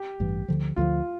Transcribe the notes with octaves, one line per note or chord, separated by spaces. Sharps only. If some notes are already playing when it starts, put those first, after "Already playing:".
Already playing: G4
A1 G2 E3
D2 D3 F3
D2 D3 F3 F4